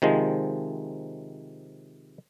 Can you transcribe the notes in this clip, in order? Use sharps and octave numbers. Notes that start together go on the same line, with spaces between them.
C3 D#3 F3 G#3